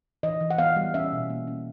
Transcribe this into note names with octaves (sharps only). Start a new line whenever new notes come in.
E3 D#5
E3
F#5
B3 F5
G3
C#4 E5
B2
A#3
C#4